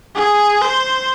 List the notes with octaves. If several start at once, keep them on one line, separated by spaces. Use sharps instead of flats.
G#4
C5